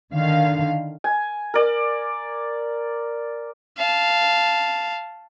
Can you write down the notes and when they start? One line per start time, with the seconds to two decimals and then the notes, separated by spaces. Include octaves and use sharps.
0.14 D3 D#3 F5
1.04 G#5
1.54 A#4 D5
3.77 F5 A5